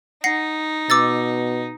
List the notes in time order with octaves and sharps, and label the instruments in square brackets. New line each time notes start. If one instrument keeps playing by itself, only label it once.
[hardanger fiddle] D#4 [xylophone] F#5 A#6 C7
[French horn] B2 [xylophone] D6 E6 A6